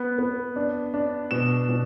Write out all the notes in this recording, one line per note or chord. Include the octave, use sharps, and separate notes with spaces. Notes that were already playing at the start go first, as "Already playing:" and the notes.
Already playing: B3
B3
D4
D4
B2 E7
B2